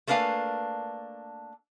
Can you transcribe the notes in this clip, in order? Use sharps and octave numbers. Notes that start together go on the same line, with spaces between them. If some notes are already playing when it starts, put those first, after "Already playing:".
A3 A#3 D4 B4 F5 G#5